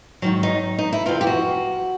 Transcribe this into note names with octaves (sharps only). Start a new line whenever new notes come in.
G#2 D#3 F#3
D#4
D#4
E4
F2 C3 E3 F4
G4
F#4